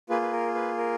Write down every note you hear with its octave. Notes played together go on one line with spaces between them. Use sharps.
A#3 F4 G#4 B4
B4
A#4
B4
A#4